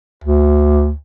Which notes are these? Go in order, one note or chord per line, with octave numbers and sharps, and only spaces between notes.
D2